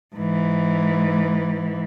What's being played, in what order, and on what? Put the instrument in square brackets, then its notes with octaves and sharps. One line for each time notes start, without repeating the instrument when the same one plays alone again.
[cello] G#2 E3